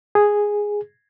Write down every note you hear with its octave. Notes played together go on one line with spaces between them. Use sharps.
G#4